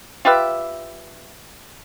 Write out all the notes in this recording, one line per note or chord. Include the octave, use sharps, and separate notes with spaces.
F4 G4 B4 E5